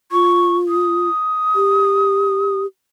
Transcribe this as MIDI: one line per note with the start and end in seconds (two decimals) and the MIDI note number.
0.12 1.09 65
0.12 0.57 85
0.68 2.62 87
1.55 2.66 67